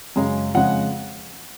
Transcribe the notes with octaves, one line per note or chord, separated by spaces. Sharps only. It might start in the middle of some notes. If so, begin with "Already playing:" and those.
F#2 C#3 G#3
F2 C#3 G#3 F#5